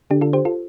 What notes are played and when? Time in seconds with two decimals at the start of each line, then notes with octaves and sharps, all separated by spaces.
0.10 D3 D4 G4
0.21 F4 A4
0.33 G4 C5
0.45 F4 A4